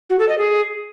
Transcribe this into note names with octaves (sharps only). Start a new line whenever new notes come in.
F#4
A4
D#5
G#4